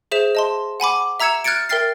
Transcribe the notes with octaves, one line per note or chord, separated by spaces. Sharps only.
G#4 C5 E5 E7
D#5 A5 C6
F#5 G#5 B5 D6
E5 A#5 E6 G#6 C#7 E7
F6 F#6 G#6 A6 C#7 D7
A#4 E5 G5 F6 A6 C7